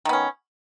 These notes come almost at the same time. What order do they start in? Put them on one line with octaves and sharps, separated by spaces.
D#3 B3 C#4